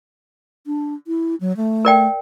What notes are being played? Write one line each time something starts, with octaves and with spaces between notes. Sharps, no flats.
D4
E4
F#3
A3
A#4 D5 G5